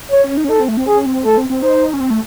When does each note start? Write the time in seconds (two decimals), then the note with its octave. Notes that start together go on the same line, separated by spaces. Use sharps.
0.11 C#5
0.24 C#4
0.37 D#4
0.44 C#4
0.49 D#4 A4
0.59 C4
0.68 A3
0.77 C4
0.87 C#4 G#4
1.06 C4
1.25 A3 A4
1.37 C4
1.50 C4
1.62 D#4 C5
1.93 C#4
2.00 C4
2.10 A3